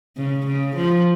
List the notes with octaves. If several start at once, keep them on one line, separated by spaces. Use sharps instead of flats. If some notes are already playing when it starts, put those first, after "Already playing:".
C#3
C#3
F3